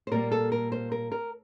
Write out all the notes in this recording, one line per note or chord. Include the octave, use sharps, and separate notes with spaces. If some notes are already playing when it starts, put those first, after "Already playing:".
C5
A#2 G3 A#3 A#4
A4
A#4
C5
A#4
A#4